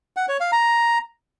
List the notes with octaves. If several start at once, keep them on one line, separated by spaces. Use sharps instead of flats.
F#5
C#5
F5
A#5